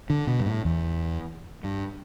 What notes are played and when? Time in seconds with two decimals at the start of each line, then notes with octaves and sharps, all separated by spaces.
0.10 D3
0.27 B2
0.40 G2
0.46 A2
0.65 E2
1.64 G2